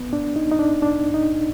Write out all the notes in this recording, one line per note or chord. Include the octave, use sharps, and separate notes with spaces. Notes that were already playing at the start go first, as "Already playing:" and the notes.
Already playing: B3
D4
D#4
D#4
D4
D4
D#4